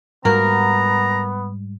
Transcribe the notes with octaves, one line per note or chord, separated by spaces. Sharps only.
G#2 G3 A#3 B3 F#4 A#4 A#5